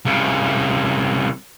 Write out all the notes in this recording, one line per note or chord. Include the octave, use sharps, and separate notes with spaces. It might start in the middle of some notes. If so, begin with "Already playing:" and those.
C2 C#3